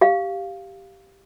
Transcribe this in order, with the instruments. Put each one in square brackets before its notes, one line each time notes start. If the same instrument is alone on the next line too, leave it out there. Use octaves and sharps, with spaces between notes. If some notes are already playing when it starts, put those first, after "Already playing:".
[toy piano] G4 F5